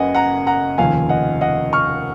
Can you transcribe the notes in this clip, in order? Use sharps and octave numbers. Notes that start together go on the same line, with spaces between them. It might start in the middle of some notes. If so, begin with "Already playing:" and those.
Already playing: F#1 F#2 C#3 B4 D#5 F#5 G#5
F#5 A#5
F#5 A#5
F1 D#2 C#3 F3 F5 G#5
D#5 F#5
D#5 F#5
C#6 F6